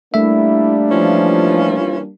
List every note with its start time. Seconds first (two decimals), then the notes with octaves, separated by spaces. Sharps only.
0.14 G3 A3 A#3 D4 E4 E5
0.90 E3 F3 C#4 F4